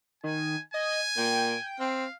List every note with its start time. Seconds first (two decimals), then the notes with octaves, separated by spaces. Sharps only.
0.24 D#3 G#5
0.74 D#5 G#5
1.18 A#2 G5
1.80 C4 F5